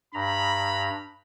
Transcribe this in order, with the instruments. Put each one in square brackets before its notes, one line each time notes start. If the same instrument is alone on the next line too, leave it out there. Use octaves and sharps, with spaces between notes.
[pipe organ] G2 A#5 [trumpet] B5